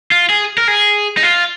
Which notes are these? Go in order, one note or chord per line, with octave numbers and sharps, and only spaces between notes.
F4
G#4
A#4
G#4
D#4
F4